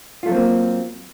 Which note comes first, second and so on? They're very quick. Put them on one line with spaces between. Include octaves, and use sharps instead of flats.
F4 A3 F#3 C4 A#3